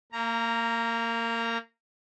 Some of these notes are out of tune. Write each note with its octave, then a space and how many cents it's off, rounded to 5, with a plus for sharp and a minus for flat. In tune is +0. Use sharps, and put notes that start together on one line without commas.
A#3 -25 A#5 +0